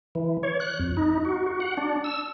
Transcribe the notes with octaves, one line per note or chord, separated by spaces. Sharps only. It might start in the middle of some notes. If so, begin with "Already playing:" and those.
E3
C#5
F#6
F2
D#4
F#4
F#4
F#5
D4
E6